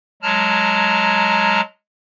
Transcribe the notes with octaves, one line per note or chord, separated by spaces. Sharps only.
F#3 G#3 A5 A#5 F6